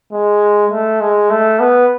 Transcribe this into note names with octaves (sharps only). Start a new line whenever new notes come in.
G#3
A3
G#3
A3
B3